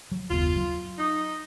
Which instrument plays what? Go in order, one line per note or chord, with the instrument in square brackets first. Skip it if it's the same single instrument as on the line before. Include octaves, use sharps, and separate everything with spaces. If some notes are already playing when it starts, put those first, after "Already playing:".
[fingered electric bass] F#3
[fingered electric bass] F#1 D#2 B3 [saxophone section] F4
[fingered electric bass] F#3
[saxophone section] D#4